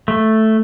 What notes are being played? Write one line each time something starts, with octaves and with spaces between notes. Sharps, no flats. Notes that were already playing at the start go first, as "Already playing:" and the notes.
A3